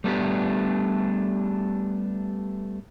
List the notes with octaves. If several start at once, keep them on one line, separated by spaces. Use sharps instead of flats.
G3 A3 B3 D4 G4